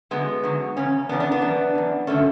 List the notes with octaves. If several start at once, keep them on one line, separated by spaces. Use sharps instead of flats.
F#2 D3 F#3 G#3 B3
F#2 D3 F#3
E2 C#3 C#4
E2 C#3 E3 B3 D4
B3 D4
B3 D4
F#2 E3
F#2 E3
D3 F#3 A3 C#4